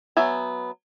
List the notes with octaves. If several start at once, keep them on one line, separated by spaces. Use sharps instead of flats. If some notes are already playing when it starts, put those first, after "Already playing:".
F#3 B3 E5 G#5